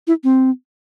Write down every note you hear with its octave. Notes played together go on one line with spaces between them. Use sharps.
E4
C4